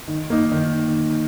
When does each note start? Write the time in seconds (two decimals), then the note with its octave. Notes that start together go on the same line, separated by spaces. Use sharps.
0.08 D#3
0.30 A#3 D#4
0.51 D#3